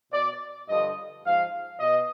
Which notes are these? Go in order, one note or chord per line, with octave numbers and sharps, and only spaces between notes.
B2 D5
G2 D3 F3 D#5
G#2 F3 F5
B2 D#5